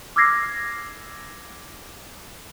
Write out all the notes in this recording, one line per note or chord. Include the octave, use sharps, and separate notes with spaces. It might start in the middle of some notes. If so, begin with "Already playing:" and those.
D6 E6 F6 G#6 A#6 C7